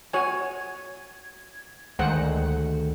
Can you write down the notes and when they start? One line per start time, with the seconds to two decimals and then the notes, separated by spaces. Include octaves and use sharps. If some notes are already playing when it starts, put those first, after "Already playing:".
0.13 F#4 C#5 G#5 G#6
1.99 D2 D#3 G#3 C5 F#5